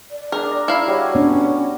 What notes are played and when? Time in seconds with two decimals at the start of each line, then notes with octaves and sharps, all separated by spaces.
0.11 D5
0.32 D4 G#4 A#4
0.51 A#5
0.68 E4 F5
0.87 G3 F#4 C#5
1.15 B3 C#4 D4